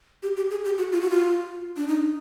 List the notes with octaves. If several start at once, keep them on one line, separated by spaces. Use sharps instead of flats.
G4
G4
G#4
G4
F#4
F4
F#4
F4
D4
D#4